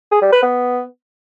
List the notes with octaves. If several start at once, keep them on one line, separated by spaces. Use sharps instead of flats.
G#4
G3
B4
B3